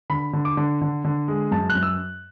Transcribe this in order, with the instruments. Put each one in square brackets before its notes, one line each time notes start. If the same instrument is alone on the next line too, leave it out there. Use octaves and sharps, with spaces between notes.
[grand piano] D3 B5
D3
D6
D3
D3
D3
G#3
F#2 A5
F#6
F#2
E6